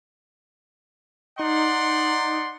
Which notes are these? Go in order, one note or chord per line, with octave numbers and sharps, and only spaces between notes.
D#4 D5 F#5 C6